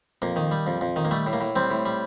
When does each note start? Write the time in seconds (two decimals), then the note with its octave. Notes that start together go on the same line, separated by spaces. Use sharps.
0.22 F2 A#3
0.36 D#3
0.52 G3
0.67 F2
0.81 F2
0.96 D#3
1.05 A#3
1.11 G3 A3
1.27 A2
1.33 A#3
1.41 A2
1.56 G3 C4
1.71 A2
1.86 G3